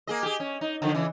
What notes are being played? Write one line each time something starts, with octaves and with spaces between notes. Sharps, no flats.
A#3 G#4 D#5
G4 G#4
C#4
D#4
D3 D#3 F3
C#3 E3